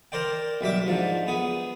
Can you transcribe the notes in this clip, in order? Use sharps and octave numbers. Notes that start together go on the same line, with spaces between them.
A#4 C5 D5 G5
B1 G3 E5 D6
G#2 F3 D4
B3 G#4